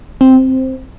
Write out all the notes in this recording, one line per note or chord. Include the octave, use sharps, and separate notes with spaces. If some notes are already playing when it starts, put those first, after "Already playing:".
C4